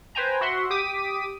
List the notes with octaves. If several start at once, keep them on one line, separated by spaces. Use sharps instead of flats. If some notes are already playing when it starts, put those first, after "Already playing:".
B4 C5 G5 G#5 A#5
F#4 E5 F#5 C6
G4 D6 D#6 B6 D#7